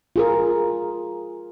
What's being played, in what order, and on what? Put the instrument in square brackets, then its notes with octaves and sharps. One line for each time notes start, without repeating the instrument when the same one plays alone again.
[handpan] F4 G#4 A#4